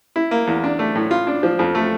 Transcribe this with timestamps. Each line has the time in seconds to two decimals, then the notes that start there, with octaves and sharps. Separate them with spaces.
0.16 E4
0.31 A#3
0.47 E2
0.64 D4
0.79 A3
0.95 A2
1.11 F4
1.27 D4
1.43 F3
1.59 F2
1.75 A3